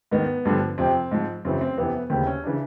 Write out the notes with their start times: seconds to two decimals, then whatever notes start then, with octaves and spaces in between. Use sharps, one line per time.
0.11 G#2 D#3 B3
0.45 G2 D3 F3
0.78 F2 C3 F3 C4
1.11 G#2 F3
1.45 F#2 C#3 E3 C4
1.61 C4
1.78 F2 C3 E3 B3
2.10 D#2 C#3 E3 C4
2.27 C#4
2.44 C#3 E3 D4